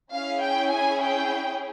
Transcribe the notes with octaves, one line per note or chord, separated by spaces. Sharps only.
C#4 E4 G#4 F5
G5
G#5
G5